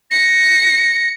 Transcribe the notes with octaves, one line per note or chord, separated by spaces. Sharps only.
A#6 C#7